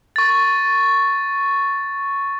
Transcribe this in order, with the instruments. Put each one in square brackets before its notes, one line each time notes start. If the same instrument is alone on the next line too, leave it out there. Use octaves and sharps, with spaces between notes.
[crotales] C#6 A6